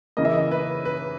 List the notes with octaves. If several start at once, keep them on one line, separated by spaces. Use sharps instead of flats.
C#3 E3 A#3 D#5
E5
D#5
B4
B4